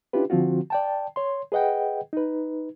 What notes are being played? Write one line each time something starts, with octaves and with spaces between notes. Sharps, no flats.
C#4 D4 E4 F4 G4 B4
D3 F3 C4 F4 F#4
D5 G5 A5
C#5 C6
G#4 B4 D#5 F#5 G5
D#4 B4